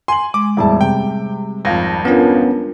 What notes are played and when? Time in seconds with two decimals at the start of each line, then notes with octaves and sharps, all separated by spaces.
0.08 G#5 C6 F#7
0.34 G#3 D6
0.57 E1 A2 G3 G#4 E5 A5
0.81 C3 G5
1.65 G#1 F2 F5 A#6
2.05 B3 C#4 D4 F4 A#4